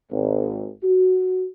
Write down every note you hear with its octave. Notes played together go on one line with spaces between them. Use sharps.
G#1
F#4